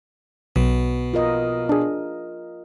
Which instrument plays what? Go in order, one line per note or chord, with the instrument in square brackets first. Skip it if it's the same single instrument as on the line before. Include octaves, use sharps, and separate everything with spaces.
[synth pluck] B1 [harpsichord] B2
[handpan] F4 A#4 D#5
[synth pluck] D4 G#4